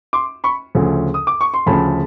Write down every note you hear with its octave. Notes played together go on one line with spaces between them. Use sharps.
C6 D6
B5 C#6
D2 C#3 F3 A3
D#6
D6
C#6
C6
D2 C#3 F3 A3 A5 B5